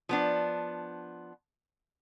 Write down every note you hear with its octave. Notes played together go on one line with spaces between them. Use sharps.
F3 B3 D4